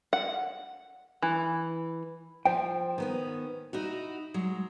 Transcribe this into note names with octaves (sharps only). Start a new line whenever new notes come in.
F#5
E3
F3 C5 G5
D#3 B3 C#4
D#4 E4 F#4
F#3 G#3